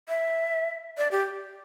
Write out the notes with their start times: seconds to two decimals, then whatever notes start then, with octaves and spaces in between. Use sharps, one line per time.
0.09 E5
0.98 D5
1.11 G4